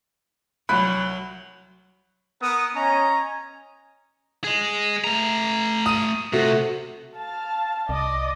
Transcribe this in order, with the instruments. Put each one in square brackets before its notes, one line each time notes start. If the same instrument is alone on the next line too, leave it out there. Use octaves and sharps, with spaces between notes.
[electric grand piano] C2 B5 F#6 [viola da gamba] F#3
[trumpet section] B3 A#4 D#6
C#4 C#5 D#5 G#5 A#5
[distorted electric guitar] G#4 D#5
A3 A#5
[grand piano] D#6 D#7
[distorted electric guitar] C3 [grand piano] A3 F#4
[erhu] F5 [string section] A5
[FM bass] C2 [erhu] D5 [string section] D#5